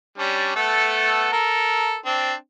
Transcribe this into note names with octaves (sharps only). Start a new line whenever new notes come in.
G3 C#4 D4
A3 B3 A4
A4 A#4
C4 D4